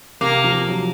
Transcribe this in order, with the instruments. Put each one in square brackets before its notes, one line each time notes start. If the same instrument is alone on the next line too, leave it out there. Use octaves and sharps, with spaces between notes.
[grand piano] C3 [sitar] A#3
[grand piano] F3
F#3